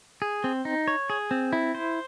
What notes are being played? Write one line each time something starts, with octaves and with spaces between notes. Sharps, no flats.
G#4
C4
D#4
C#5
G#4
C4
E4
C5